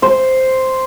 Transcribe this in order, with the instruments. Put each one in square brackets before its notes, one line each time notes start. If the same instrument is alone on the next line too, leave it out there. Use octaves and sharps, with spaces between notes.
[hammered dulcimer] C5